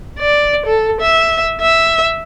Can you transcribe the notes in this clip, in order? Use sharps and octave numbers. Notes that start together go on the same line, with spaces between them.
D5
A4
E5
E5